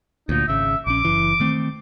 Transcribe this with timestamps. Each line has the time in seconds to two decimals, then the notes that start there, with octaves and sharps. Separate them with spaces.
0.29 D2 A#2 D#4
0.48 G#1 C#3 E5
0.87 A#1 C#4 D6
1.05 F#1 E3
1.40 D#3 A3 C4